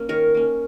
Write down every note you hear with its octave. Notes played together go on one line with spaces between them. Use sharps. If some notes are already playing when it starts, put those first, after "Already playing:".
Already playing: A#3 C#4
D#3 A#4 C#5
A#3 C#4